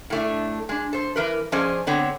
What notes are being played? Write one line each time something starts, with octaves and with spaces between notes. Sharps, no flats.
A2 A3 D4
G#3 D4
A4 C5
E3 A#4 B4
F3 C#4 G#4 C5 D5 D#5
D3 B3 C4 C#5